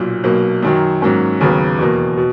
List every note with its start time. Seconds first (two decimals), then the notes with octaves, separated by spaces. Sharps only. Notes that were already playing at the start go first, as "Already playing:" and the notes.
Already playing: B1 A#2
0.24 B1 B2 A#3
0.63 F#2 D#3 F#3
1.02 G#2 F#3 A#3 C#4
1.40 D#2 C#3 F#3 B3
1.79 E2 B2 A#3
2.17 B2